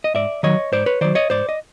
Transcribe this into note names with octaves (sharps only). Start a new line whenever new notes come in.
D#5
G#2 D5 E5
D#3 F#3 C#5 D#5
G#2 C5 D5
B4 C#5
D#3 F#3 C5 D5
C#5 D#5
G#2 C5 D5
D#5